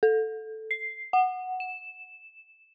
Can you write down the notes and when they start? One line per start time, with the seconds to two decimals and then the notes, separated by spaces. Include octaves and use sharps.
0.03 A4
0.71 C7
1.13 F#5
1.60 E7